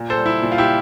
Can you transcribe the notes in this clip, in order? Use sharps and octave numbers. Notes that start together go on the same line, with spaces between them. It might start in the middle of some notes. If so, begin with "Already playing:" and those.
Already playing: A#2
A4 C5
G3
E4
A#2
F4
E4 G4